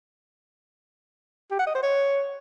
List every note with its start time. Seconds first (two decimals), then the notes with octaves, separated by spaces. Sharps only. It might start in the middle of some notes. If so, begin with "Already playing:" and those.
1.51 G4
1.59 F#5
1.67 D#5
1.75 C5
1.83 C#5